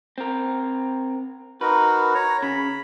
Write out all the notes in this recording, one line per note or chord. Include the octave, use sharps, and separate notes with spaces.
C4 A#4
D#4 F#4 A#4 B4
C#5 A#5
C#3 B5